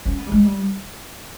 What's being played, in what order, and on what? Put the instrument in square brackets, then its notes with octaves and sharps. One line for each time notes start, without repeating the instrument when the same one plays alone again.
[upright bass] C#4
B3
G3
G#3
G3